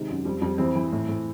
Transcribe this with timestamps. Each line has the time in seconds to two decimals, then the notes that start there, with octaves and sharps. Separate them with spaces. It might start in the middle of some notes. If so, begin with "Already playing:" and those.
Already playing: C3 D#3 G#3
0.09 F#2
0.25 F2 G3
0.42 F2 G3
0.58 E3 C4
0.75 E3
0.92 A2
1.08 A2